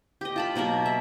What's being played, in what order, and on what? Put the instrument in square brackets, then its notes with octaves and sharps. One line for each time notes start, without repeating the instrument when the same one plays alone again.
[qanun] G4 D#5
F4 A5 B5
B2 F#3 A#3 A#4
E5